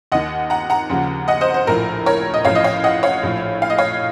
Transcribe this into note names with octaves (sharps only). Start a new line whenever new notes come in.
D#2 D#3 D#5 F#5
F#5 A#5
F#5 A#5
D#2 C#3 F3
D#5 F#5
C5 D#5
C5
A#1 A2 F3 A#4
A#4 C#5
D#5
A1 A2 F3 C#5 F5
D#5
C#5 F5
D#5 F#5
C#5 F5
A#1 A2 F3
F5
D#5
C#5 F5